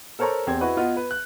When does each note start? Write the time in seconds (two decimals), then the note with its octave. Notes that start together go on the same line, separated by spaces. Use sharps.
0.19 A4 A#4 C5 C#5 A5 A#5
0.47 E2 C4 G4 C5 G#6
0.60 E4 F#4 B4 D#5
0.77 B3 F4 D#5 F#5
0.97 B4
1.11 F#6